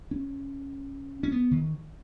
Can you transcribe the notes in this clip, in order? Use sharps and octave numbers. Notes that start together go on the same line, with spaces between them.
C#4
C#4
B3
D#3